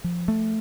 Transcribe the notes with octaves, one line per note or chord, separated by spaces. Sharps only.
F3
A3